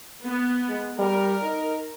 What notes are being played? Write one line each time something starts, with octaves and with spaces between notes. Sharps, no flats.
B3
G#3
G3 A#4
D#4